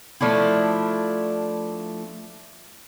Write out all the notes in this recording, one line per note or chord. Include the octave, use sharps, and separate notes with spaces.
F3 A3 D4 E4